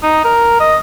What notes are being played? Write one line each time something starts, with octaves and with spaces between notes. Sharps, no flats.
D#4
A#4
D#5